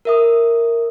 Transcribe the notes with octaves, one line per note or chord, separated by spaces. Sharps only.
A#4 E5 D#6